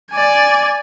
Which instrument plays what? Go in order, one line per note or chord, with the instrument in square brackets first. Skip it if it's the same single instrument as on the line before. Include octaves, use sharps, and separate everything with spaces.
[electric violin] D5 G#5